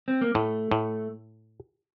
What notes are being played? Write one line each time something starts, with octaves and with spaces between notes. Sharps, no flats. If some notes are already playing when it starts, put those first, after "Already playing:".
C4
A#3
A2 A3
A2